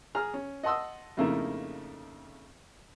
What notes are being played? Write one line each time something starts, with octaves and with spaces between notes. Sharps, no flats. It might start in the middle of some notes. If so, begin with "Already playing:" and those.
G#4 A#5 F6
C#4
D#5 F#5 A5 C6 D#6 E6
F2 C#3 A3 A#3 D#4 E4